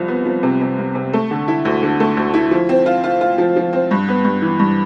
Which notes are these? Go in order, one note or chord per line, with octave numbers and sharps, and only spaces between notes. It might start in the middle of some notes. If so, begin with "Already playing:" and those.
Already playing: C2 F3
B3
F3
C3
C3
C2
C3
A3
D3
E4
D2
D3
A3
D2
E4
F3
C4
F4
F4
F4
F3
F3
C4
G2
B3
G2
E3
G2